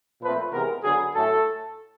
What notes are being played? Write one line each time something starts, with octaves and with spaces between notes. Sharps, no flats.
A#2 F3 A3 C4 B4
C3 E3 G#3 B3 A#4
D3 F#3 B3 G#4
A2 F#3 A3 A4